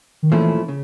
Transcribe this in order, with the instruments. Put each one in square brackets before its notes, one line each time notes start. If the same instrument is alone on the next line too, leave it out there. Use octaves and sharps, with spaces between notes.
[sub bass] D#3
[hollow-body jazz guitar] A#2 F3 A3 C#4 E4 [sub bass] E3
[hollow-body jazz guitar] C#3